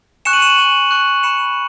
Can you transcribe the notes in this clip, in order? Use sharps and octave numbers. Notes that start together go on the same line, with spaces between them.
G#5 C#6 F#6 C#7 E7
D#7 F#7
C#7 E7
D#7 F#7
G#5 C#6 F#6
G#5 C#6 F#6
B5 F#6 C#7 E7